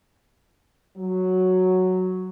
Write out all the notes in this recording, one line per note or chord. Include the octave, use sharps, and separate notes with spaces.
F#3